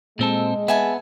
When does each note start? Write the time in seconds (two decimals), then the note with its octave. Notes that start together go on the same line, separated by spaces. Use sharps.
0.19 A#2 G#3 C4 A4
0.68 B3 E5 G#5 A5